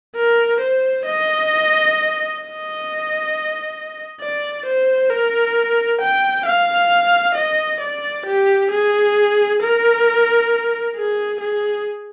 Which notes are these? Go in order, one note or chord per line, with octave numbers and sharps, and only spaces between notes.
A#4
C5
D#5
D#5
D5
C5
A#4
G5
F5
D#5
D5
G4
G#4
A#4
G#4
G#4